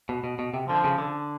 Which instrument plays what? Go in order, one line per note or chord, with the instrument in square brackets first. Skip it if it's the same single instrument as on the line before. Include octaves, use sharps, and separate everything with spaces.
[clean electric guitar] B2
B2
B2
C3
[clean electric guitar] D3 [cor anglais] F3
[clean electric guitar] C#3
D3